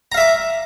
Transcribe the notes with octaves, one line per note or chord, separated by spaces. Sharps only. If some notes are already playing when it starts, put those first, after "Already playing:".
E5 F5 A#5 D6